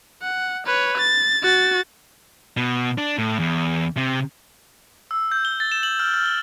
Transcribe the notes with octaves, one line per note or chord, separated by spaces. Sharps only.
F#5
B4 C#5
A6
F#4 A6
B2
D4
A2
E2
C3
E6
G6
G7
A6
E7
F#7
F6
F6
G7